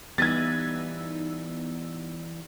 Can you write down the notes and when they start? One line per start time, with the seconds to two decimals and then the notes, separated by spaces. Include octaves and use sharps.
0.18 E3 G3 B3 D#4 E6 G#6 A6